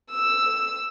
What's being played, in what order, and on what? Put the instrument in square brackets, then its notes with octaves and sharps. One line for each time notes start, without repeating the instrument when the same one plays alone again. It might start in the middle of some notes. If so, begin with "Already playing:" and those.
[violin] E6